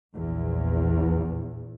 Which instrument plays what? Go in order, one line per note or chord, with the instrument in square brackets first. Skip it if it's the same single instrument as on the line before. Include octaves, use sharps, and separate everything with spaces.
[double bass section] A#1 E2